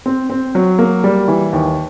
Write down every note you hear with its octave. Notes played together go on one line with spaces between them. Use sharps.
C4
C4
F#3
A#3
G3
E3
D#2